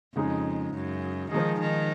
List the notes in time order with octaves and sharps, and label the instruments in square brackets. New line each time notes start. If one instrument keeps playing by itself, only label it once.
[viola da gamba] F2 [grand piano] C#3 G#3 D#4 G#4
[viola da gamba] F#2
[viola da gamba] D#3 [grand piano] F3 G#3 D#4 G#4
[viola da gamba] D#3